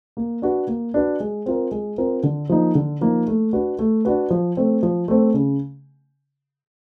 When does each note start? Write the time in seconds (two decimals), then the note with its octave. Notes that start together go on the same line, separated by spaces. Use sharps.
0.17 A#3
0.42 D4 F#4 B4
0.68 A#3
0.94 D4 F#4 B4
1.20 G#3
1.46 C4 F4 A#4
1.71 G#3
1.98 C4 F4 A#4
2.23 D3
2.49 F3 A#3 D#4
2.75 D3
3.01 F3 A#3 D#4
3.27 A3
3.53 D4 F#4 B4
3.79 A3
4.05 D4 F#4 B4
4.30 F3
4.57 A3 C4
4.83 F3
5.08 A3 C4
5.34 C#3